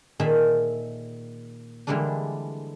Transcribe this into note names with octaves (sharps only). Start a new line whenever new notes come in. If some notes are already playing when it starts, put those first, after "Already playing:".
A#2 D#3 G#4 A4 C5 E5
D3 E3 G3 G#3 A#3 D4